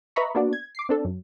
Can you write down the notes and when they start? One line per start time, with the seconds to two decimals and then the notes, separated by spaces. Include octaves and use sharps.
0.16 B4 D#5 E5 A#5 B5 C#6
0.35 A#3 B3 D4 F#4 D5
0.53 G#6
0.75 D6 C7
0.89 C4 D4 A4
1.05 F#2